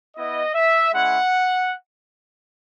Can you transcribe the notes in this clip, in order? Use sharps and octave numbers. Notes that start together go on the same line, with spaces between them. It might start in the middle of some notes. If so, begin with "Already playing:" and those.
B3 E4 D#5
E5
G#3 C#4 E4 F#5